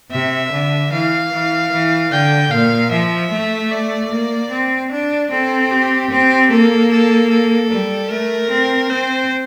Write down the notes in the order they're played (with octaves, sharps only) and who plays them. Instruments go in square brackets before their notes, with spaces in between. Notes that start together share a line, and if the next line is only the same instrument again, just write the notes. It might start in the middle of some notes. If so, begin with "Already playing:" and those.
[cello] C3 [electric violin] E5
[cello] D3
[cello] E3 [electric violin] F5
[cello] E3
E3
[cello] D3 [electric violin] G5
[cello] A#2 [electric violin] F5
[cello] F3 [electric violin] E5
[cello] A3
[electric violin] D5
[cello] A#3
C4
D4
[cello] C4 [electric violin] A4
[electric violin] G4
[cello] C4
[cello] A#3 [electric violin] A4
[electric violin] A4
A4
[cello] G3
[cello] A3 [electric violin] A#4
[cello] C4
[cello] C4 [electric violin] C5